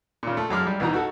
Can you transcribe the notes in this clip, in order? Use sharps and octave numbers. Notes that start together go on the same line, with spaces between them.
A#2 C#3
A3
F#2 G#3 D6 F6
G3
C2 B2 E3 D#4 A#5
F#4 A4